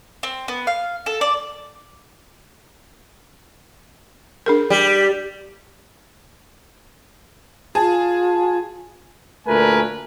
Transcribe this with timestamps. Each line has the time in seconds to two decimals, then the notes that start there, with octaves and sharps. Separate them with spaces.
0.23 C4
0.48 B3
0.67 F5
1.06 A4
1.21 D5
4.46 D4 G#4 A#4
4.70 G3
7.75 F4 G#4 A5
9.47 D2 A#2 A3 A#4 B4 G#5